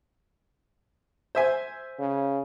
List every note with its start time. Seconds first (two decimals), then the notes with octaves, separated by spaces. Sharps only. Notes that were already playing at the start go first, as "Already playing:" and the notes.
1.35 C5 E5 G#5
1.99 C#3